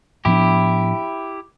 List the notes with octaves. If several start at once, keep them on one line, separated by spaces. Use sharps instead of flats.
A2 F3 B3 D4 E4 G4